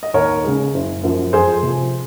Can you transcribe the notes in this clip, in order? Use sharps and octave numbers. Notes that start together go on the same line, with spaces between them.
D#5
D#2 A#4 C#5
C#3 G#3
F#1
F#2 F3
F2 G#4 C5
C3 F3